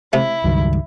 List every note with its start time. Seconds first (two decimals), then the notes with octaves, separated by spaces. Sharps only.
0.13 C3 A3 E4
0.44 C#2 G2 D#3 F#3